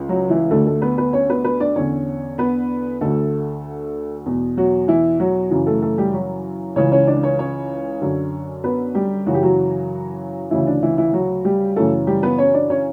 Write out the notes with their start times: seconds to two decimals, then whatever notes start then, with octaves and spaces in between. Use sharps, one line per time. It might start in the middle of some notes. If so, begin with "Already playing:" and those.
Already playing: C#2 C#3
0.09 F#3 F#4
0.30 E3 E4
0.51 D2 D3 A3 A4
0.67 A3 A4
0.82 B3 B4
0.98 B3 B4
1.13 C#4 C#5
1.29 B3 B4
1.44 B3 B4
1.60 D4 D5
1.76 E2 D3 C#4 C#5
2.38 B3 B4
3.01 D2 D3 A3 A4
4.26 E2 B2
4.57 F#3 F#4
4.88 E3 E4
5.20 F#3 F#4
5.50 F#2 C#3 E3
5.66 A3 A4
5.82 A3 A4
5.98 G3 G4
6.14 F#3 F#4
6.76 C#2 C#3 E3 C#4 C#5
6.92 C#4 C#5
7.07 D4 D5
7.23 C#4 C#5
7.38 C#4 C#5
8.02 F#2 D3
8.64 B3 B4
8.95 G3 G4
9.26 F#2 C#3 E3 F#4
9.34 G4
9.43 F#3 F#4
10.51 D2 C#3 E3 E4
10.67 D4
10.83 E3 E4
10.98 E3 E4
11.13 F#3 F#4
11.45 G3 G4
11.76 F#2 C#3 E3 A3 A4
12.07 G3 G4
12.23 B3 B4
12.38 C#4 C#5
12.54 D4 D5
12.70 C#4 C#5